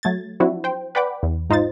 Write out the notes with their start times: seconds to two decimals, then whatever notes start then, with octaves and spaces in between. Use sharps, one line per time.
0.03 F#3 A3 G#6 A6
0.40 F3 F#3 C4 D4 E4 F#4
0.64 C5 G5
0.95 B4 D5 F#5 G5 B5 D6
1.23 E2
1.50 G#2 D#4 F4 C5 A6